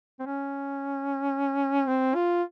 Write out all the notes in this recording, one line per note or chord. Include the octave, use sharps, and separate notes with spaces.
C4
C#4
C4
F4